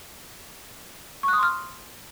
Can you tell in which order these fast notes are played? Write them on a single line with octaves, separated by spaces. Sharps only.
C#6 F#6 D#6 C6 F6